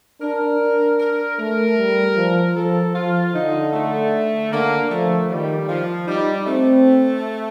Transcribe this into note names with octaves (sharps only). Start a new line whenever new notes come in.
D4 A#4
D4
A#4
A3 A#4
G3
F3
F3 A4
F3 F4
D3 D#4
A3
D3 A#3
F3 A3
D#3 G3
F3
G3 D#4
A3 C4